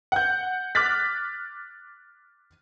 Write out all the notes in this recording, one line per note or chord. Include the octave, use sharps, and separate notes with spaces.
F#5 G6
D6 F6 F#6 A6 B6